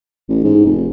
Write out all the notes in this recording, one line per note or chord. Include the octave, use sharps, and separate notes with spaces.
A1
G#2
F1